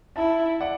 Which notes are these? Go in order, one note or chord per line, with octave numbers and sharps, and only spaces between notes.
E4 E5 A5
D5 F#5